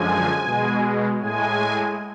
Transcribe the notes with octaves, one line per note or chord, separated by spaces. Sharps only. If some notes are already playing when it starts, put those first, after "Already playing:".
Already playing: F#2 D3 F3 G#3 G#5
B2 G#3
A2 G#3 G#5